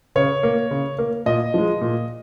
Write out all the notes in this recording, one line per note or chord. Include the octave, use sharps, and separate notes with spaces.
C#3 C#5
A#3
C#3
A#3
A#2 D#5
F3 G#3
A#2